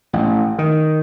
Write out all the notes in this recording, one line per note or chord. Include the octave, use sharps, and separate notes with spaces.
A1
D#3